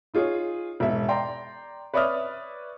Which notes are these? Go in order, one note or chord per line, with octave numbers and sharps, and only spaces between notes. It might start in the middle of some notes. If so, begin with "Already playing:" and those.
D#4 F4 G#4 C#5
E1 G#2 E5
D5 G5 A#5 C6
B4 C#5 D5 E5 D#6 F6